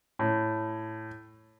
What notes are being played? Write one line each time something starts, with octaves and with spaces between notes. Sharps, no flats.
A2